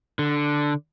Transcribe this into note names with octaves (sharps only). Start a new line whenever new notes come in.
D3